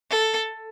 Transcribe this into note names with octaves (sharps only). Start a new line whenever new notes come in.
A4